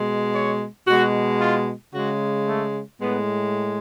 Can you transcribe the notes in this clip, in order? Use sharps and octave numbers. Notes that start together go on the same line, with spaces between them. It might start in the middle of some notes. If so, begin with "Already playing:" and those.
Already playing: B2 G#3
C#5
B2 G#3 F#4
F4
C#3 G#3 F#4
A3
A2 G#3 B3